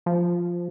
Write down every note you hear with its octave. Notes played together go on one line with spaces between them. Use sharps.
F3